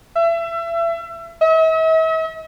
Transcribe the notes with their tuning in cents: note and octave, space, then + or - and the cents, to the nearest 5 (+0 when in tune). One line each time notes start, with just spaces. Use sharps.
E5 +30
E5 -45